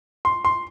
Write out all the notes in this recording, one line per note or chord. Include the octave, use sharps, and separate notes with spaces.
C6
C6